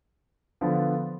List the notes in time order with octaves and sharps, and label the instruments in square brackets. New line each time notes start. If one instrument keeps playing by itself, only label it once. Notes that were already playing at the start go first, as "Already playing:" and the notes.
[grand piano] D3 F3 B3 F4